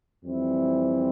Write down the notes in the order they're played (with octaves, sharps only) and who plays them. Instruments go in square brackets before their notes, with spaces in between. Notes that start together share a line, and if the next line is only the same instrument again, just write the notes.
[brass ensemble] F2 E3 G3 C4 E4